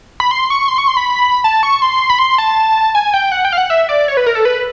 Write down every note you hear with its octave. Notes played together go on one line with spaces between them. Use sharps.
B5
C6
C#6
C6
C#6
C6
B5
A5
C#6
C6
B5
C6
A5
G#5
G5
F#5
G5
F5
F#5
E5
D5
C#5
B4
A#4
A4
B4